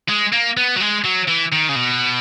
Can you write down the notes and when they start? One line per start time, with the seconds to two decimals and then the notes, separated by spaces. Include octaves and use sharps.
0.09 G#3
0.33 A#3
0.57 B3
0.76 F#3
0.80 G#3
1.04 F#3
1.28 E3
1.52 D#3
1.69 C#3
1.75 B2